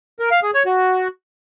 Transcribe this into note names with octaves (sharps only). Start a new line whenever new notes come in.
A#4
F5
G#4
C#5
F#4